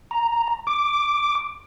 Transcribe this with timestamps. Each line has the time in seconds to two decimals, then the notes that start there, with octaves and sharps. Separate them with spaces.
0.11 A#5
0.67 D6